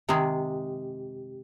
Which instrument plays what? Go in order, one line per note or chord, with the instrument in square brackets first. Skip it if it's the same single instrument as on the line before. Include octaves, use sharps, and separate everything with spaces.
[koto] C3 D#3 G#3 [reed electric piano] G4